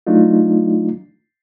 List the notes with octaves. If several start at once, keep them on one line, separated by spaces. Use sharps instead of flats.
F#3 A3 D4 D#4 F4